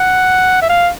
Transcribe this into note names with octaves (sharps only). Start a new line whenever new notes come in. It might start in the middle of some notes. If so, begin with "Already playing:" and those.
Already playing: F#5
E5
F5